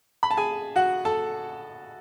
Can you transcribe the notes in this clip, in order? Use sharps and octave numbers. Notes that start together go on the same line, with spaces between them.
B5
A5
G#4 G#5
F#4 F#5
A4 A5